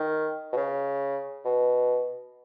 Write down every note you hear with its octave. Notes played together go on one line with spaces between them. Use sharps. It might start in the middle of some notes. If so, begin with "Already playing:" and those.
Already playing: D#3
B2
C#3
B2